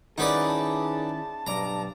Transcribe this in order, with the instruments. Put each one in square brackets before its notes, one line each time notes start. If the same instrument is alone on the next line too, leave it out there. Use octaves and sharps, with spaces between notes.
[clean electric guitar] D#3 C#4 E4 [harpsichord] D#4 B4 D5 [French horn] G#4 [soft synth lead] F#5
[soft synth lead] A5
[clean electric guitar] B1 D5 [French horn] G2 [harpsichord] A#5